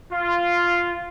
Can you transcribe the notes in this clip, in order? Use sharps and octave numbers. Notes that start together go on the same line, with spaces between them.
F4